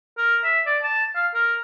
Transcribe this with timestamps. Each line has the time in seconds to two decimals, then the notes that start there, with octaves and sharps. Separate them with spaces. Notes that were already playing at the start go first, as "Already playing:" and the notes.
0.18 A#4
0.44 E5
0.66 D5
0.83 A5
1.15 F5
1.34 A#4